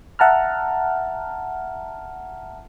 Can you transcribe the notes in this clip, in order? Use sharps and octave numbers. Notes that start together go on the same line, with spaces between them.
E5 F#5 A5 A#5 F6